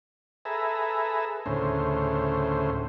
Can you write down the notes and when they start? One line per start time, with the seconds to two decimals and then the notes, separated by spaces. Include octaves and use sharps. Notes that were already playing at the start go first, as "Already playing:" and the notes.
0.45 G#4 A4 B4 E5 A#5
1.46 D2 A2 C#3 C5